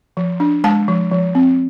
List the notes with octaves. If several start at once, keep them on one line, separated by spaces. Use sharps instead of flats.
F3
D4
G#3 A5
F3
F3
C4